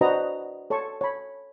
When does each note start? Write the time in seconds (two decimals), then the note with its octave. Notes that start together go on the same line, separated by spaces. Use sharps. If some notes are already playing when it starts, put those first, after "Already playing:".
0.01 D4 F#4 B4 C5 D#5 A#5
0.70 A4 C#5 A5 C6 C#6
1.01 C#5 B5